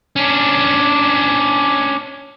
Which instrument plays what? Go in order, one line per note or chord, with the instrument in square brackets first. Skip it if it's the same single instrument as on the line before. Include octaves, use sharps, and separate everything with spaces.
[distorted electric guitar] C#4 D4